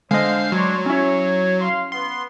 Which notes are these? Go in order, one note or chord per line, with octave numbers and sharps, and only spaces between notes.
D3 G#3 C5 D#5 F5 C7
F#3 D4 C#5 C6
C#4 E4 C#5
F5 C6
B3 C6